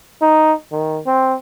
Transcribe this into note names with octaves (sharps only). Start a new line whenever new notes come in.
D#4
D#3
C4